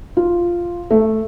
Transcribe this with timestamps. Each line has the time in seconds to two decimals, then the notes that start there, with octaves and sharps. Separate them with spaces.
0.17 F4
0.90 A3